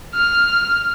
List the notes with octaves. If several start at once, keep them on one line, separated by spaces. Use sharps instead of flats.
F6